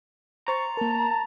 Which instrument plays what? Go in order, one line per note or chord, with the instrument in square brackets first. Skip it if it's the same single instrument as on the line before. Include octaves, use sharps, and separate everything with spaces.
[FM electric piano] C5 C6 A6 [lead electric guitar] A#5 [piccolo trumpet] C#6
[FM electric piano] A#3 A#4 [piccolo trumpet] A5